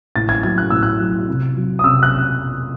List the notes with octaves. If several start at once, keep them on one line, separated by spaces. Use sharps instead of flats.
A2 A6
G#6
F#3 G#6
F#6
A2 E6
F#6
F#3
C3
F#3
D#6
C3 E6
F#6